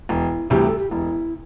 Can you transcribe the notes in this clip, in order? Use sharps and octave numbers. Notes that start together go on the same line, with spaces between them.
E1 E4
D2 C3 E3 G3 G4
A4
G4
E1 E4